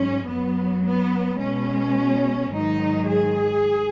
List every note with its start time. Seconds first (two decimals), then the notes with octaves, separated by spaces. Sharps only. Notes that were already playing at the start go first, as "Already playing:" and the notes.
Already playing: G#2 F#3 C#4
0.27 F#2 F#3 B3
0.84 B3
1.40 B2 G#3 C#4
2.51 G#2 D#3 F#3 D#4
3.08 G#4